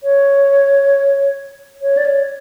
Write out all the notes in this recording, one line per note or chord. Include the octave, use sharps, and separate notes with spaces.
C#5
C#5
D5
C#5